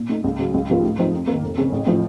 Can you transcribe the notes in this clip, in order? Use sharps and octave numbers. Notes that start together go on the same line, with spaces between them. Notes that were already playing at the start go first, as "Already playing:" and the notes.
Already playing: A#2
A3 D#4
C#2
C#3 F#3
C#2
C3 F3 A#3 F4
A2
F3 C4 D#4
F2
D#3 A#3
F1
F2 C#3
A1
A2 F3